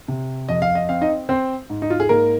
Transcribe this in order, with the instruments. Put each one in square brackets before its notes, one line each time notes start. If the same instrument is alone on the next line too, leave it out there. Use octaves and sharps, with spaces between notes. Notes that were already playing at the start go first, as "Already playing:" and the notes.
[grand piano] C3
F2 D#5
F5
D#5
C4 F5
D#4 D#5
C4 C5
G#2
D#4
F4
G#4
G#2 A#3 A#4